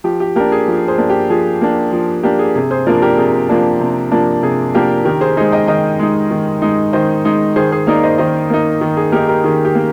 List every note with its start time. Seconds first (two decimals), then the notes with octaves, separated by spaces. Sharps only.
0.04 F3 G4
0.20 G4
0.36 A#3 D4 G4 A#4
0.52 G#4
0.68 F3
0.88 G#4 C5
0.98 A#3 D4
1.10 G4
1.30 F3 G#4
1.61 A#3 D4
1.92 F3
2.23 A#3 D4 G4
2.39 G#4
2.55 C3 G#4
2.71 G#4 C5
2.86 F3 A#3 D4 A#4 D5
3.02 G4 A#4
3.18 C3 G#4
3.49 F3 A#3 D4
3.81 C3
4.12 F3 A#3 D4
4.43 C3 G#4
4.74 F3 A#3 D4 G4 A#4
5.05 D#3 G4 A#4
5.21 G#4 C5
5.37 G#3 D#4 G#4 C5
5.52 D#5 G5
5.68 D#3 D#5 G5
5.99 G#3 D#4
6.31 D#3
6.62 G#3 D#4
6.93 D#3 C5 D#5
7.25 G#3 D#4
7.56 D#3 G#4 C5
7.72 G#4 C5
7.87 A#3 D#4 A#4 D5
8.03 C5 D#5
8.18 D#3 C5 D#5
8.50 A#3 D#4
8.81 D#3
8.97 G#4
9.12 A#3 D#4 G4 A#4
9.28 G4 A#4
9.44 D#3 G#4
9.65 G4
9.75 A#3